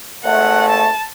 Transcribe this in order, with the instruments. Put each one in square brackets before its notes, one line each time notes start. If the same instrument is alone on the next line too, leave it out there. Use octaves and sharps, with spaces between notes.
[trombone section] G#1 A3 [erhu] F#5
[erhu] A5